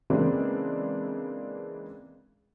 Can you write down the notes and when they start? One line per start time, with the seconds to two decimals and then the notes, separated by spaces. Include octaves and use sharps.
0.10 C#3 E3 G#3 A#3 C4 D4